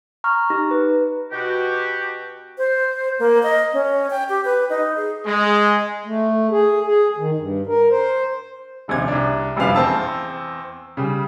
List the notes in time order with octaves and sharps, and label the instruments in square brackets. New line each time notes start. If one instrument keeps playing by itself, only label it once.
[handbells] A#5 C#6 F6
D#4 G4 A#6
B4
[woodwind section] B2 F#4 G4
[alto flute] C5
A#3
D#5
C#4
G5
G4
B4
D#4
G#4
[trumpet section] G#3
[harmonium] A3
G#4
G#4
D#3
G2
A#4
C5
[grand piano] D#1 A#1 C3 G#6
C2 D4
F1 A#1 F#2 G3 B4 F5
E2 C4 A5 E6
C#3 G3